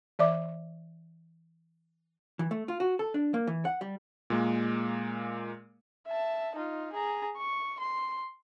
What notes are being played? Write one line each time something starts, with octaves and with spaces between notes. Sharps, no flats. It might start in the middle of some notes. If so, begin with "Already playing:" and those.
E3 D5 E5 D6
E3
A3
F4
F#4
A4
D4
A#3
E3
F#5
G3
A#2 G#3 A#3
E5 A5
D#4 F4
G#4 A#5
C#6
C6